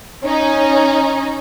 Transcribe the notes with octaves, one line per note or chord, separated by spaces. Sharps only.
C#4 D#4